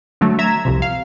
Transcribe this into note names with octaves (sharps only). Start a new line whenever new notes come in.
D3 F#3 A3
E5 A#5 G#6 E7
C2 F2 C3
F5